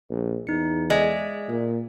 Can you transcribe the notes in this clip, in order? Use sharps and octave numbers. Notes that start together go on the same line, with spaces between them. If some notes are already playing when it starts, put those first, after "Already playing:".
A#1
E2 D#4 C#7
G#3 D5 E5
A#2